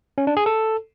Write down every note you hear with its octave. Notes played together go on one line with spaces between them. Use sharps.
C#4
D4
G#4
A4